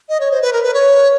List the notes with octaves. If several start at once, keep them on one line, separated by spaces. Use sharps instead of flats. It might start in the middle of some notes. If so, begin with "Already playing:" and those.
D#5
C#5
C5
B4
A#4
B4
C#5